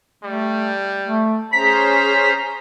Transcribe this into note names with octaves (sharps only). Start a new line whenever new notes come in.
G3 A3
A3
C#4 G#4 C5 A#5 B6